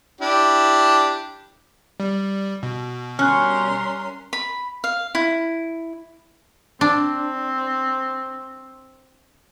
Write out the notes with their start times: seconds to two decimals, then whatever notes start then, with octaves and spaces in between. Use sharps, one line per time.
0.21 D4 E4 G4
2.00 G3
2.63 B2
3.19 G3 C#4 A#4 C6 F6 F#6
4.33 B5
4.84 F5
5.15 E4
6.81 C4 D4